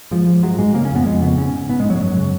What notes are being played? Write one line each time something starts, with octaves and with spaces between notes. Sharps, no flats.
G#2 F3
G#2
G#2 F#3
G#2 G#3
C#3 A#3
C#4
F2
B3
F2 G#3
C#3 B3
G#2 C#4
G#2
G#2 B3
G#3
G#2
F#3
G#3
F#2 F#3
C#3